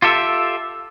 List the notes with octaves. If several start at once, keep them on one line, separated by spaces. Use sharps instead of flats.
F4 G4 A4 E5